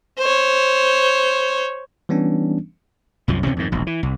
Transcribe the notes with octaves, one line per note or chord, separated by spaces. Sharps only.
C5 C#5
E3 G3 B3 C#4 D4
C2 F#2 F3
D2 C3 C4 C#4
F2 G#2 D#3
E1 A#1
E3
C2